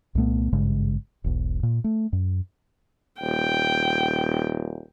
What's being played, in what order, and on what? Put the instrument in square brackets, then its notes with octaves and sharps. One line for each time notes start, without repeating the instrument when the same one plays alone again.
[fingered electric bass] C2 A#2 A3 B3
G#1 G2 C#3 G#3
E1 B1
A#2
A3
F#2
[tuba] D#1 [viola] G5